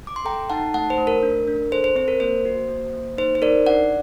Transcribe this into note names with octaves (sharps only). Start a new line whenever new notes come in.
D6
C6
A4 G5 A#5
D#4 F#5 A5
A3 F#5 A5
C5
A3
A#4
D4
D4
A4 C5
C5
C4 C5
A#4
A#3 C5
F#4
A#3
A#3
D#4 C5
C5
D#4 A#4 D5
D4 D5 F#5